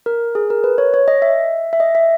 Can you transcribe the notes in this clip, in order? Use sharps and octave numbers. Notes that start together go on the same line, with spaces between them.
A#4
G#4
A#4
B4
C#5
C#5
D#5
E5
E5
D#5
E5